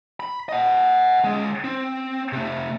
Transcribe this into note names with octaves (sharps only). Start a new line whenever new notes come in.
B5
D#5 F#5
C#2 G#3
C4
C3 A3